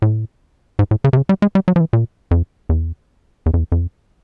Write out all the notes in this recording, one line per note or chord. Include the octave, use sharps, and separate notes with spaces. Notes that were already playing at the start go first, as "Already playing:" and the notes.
A2
G#2
A2
C#3
C3
C#3
G3
G#3
G3
F#3
F3
E3
A#2
F2
E2
E2
F2
E2
F2